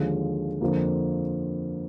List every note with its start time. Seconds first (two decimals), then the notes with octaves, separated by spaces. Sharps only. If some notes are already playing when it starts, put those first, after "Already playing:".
Already playing: D#2 D3 F3 G#3
0.61 F2 D3 F3 A#3